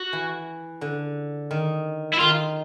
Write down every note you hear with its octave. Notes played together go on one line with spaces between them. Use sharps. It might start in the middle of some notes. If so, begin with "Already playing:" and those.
Already playing: F#4
E3
D3
D#3
E4
D#3 F4